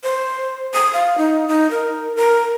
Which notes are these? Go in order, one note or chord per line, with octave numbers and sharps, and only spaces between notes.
C5
D#6
F5
D#4
D#4
A#4
A#4